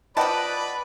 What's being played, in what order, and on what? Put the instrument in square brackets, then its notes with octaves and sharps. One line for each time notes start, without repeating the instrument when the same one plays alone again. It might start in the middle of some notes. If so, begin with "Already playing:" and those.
[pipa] F3 A5 [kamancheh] B4 [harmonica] D5 B5 [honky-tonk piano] D#5 F#5 G5